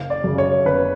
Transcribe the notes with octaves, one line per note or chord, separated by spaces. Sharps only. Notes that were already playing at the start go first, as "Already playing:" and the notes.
Already playing: F#1 F5
D5
F#2 C#3
C#5
F#1 B4